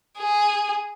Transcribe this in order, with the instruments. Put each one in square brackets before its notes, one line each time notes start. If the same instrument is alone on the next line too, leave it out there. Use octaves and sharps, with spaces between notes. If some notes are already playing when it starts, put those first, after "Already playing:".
[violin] G#4